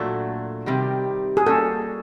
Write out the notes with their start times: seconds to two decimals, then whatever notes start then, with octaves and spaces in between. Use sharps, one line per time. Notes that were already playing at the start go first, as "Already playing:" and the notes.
Already playing: A#2 F#3 A3 D4 F#4 A4
0.66 C3 D#3 G3
1.37 G#4
1.47 G3 A#3 C#4 F#4 A4